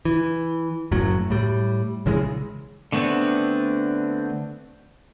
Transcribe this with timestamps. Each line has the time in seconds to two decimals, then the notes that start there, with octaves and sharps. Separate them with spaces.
0.05 E3
0.92 F#1 F#2 A2 F#3
1.30 A2 G3
2.06 A#1 C#3 E3 G#3
2.92 D3 A3 B3 C4 D4